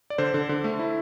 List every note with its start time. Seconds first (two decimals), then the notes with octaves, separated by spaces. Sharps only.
0.10 D5
0.18 D3 C5
0.34 D3
0.49 D3
0.64 A3
0.79 E4